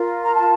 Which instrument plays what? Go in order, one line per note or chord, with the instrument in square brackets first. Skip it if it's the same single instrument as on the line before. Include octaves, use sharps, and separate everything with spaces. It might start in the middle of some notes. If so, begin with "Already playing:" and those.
Already playing: [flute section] F4 A#4
A#5
A5